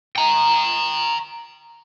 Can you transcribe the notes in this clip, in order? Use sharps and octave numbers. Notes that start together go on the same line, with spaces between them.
G5 A#5